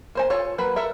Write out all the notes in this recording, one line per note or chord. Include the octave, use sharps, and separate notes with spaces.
A#3 C5 G#5
F4 A4 C#5
F#3 A#3 B4
A4 A#4 E5